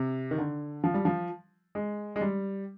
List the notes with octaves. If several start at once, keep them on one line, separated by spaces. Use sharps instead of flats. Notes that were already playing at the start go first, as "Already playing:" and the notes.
Already playing: C3
D#3
D3
F3
G3
F3
G#3
G#3
G3